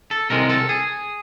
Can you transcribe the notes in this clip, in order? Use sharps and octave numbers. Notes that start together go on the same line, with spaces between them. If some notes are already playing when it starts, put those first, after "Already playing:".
A4
C2 C3 D#3 G#3 A#4
A4
G#4